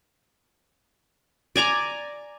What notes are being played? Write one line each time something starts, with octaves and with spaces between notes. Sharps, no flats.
D5 G#5 A#5 D6